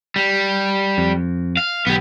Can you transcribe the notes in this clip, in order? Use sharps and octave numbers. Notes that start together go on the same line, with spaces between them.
G3
F2
F5
B1 B3 G4